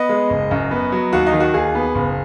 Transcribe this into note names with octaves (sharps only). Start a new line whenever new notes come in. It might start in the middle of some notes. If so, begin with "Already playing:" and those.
Already playing: B3 D#5
G#3
F#1
F#2
B3
F#3
D#2 F#4
D#4
D#3
F#4
D#2 G#4
B3
F#1